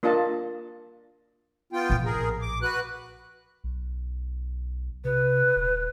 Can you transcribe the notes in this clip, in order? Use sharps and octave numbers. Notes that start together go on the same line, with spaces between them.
A#3 D4 F4 D#5 A5
B3 F4 G5
A#1 A2
G#4 A#4
D6
F#4 B4 F#6
B1
C3 B4
D#1